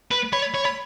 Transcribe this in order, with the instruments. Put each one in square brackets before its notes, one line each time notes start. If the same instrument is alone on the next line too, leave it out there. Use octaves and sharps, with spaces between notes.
[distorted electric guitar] B4
[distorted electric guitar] C#5 [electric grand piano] B5
[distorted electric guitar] C#5
[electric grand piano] B5